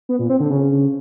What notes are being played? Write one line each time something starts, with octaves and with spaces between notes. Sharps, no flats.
B3
A#2
C4
D3
C#3